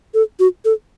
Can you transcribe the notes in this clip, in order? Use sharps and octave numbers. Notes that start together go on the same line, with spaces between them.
A4
F#4
A4